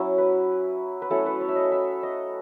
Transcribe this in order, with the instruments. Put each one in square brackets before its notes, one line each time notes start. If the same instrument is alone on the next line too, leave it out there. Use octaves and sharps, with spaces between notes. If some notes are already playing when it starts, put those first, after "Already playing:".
Already playing: [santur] F#3 C#4 E4
B4
B4
F#3 A3 C#4 E4 A4
B4
C#5
E5
D#5
E5
D#5